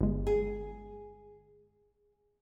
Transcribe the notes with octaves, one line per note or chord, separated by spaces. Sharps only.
G1 G#3
G#4